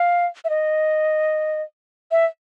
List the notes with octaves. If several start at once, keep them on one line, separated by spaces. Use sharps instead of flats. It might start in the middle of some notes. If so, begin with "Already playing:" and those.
Already playing: F5
E5
D#5
E5